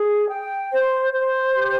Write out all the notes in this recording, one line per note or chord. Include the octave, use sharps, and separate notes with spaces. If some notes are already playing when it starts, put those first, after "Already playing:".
Already playing: G#4
G5
C5
C5
G4